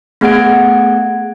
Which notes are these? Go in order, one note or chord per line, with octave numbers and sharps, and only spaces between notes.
A3 B3 G#4 F#5 G#6 D7